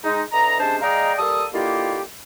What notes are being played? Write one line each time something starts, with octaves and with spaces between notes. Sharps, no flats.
G#3 D#4
D3 E3 D#5 A#5
C3 G#3 C#4 D4 C5 A5
G#3 D5 D#5 F5 G5 A#5
G3 A#3 A4 A5 D#6
D3 D#3 A#3 E4 F4 G4